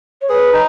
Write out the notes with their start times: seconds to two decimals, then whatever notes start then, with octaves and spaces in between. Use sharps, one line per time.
0.22 C#5
0.29 G#4 B4
0.53 D#4